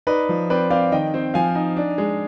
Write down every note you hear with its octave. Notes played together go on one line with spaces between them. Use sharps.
D#4 B4 D5
F3
C4 B4 D5
C4 D5 F5
D#3 D#5 G5
C4
F3 F5 G#5
D#4
D4
G#3